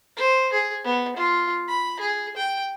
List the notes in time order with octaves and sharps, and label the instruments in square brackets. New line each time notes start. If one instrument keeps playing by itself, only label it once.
[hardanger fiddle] C5
G#4
B3
F4
B5
G#4
G5